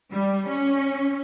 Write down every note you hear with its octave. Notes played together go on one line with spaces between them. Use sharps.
G3
C#4